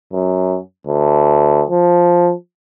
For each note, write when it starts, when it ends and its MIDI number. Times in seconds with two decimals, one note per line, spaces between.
0.13 0.58 42
0.87 1.64 38
1.70 2.33 53